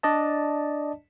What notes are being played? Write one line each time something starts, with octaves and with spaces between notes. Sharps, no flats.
D4 D5 D#5 A5